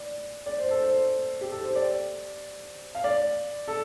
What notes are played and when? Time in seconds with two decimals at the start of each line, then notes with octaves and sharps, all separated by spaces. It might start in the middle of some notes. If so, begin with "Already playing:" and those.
Already playing: D5
0.46 D5
0.58 C5
0.70 A4
0.83 C5
1.41 G4
1.51 A4
1.63 C5
1.75 D5
2.95 F5
3.04 D5
3.68 A4